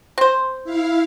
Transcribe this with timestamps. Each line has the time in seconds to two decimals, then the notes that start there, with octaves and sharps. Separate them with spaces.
0.18 C4 C5
0.64 E4 F5